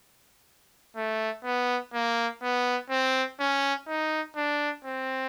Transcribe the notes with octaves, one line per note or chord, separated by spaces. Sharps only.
A3
B3
A#3
B3
C4
C#4
D#4
D4
C4